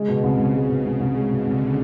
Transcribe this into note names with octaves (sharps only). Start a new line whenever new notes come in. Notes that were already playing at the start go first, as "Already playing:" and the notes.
Already playing: C#3 G#3
B2
C2
C2 C#3
G#3
B2
C2
C2
G#3
B2 D3
C2